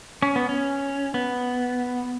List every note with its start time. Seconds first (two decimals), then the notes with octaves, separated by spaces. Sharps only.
0.22 C#4
0.36 B3
0.49 C#4
1.14 B3